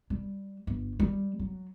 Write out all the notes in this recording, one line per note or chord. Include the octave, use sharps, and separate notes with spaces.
G3
G1
G3
F#3